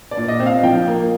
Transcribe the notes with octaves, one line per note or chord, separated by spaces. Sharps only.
D5
A#2
D#5
C4
F5
F3 G5
A#3